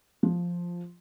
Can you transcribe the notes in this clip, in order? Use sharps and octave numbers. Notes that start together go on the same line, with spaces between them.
F3